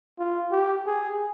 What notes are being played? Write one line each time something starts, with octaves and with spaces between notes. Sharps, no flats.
F4
G4
G#4